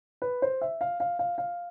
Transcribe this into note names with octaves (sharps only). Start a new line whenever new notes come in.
B4
C5
E5
F5
F5
F5
F5